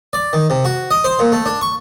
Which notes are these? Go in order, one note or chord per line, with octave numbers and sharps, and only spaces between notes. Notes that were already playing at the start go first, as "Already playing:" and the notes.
D5
D#3
C3
F#4
D#5
C5
A#2
A3
D4
C#6